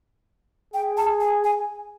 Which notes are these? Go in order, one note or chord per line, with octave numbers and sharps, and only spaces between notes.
G#4 G5
A5
G#5
G#5